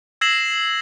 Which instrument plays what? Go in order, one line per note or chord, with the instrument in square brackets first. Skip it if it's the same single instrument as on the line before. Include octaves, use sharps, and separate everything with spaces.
[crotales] E6 G#6 A#6 C7 E7 F#7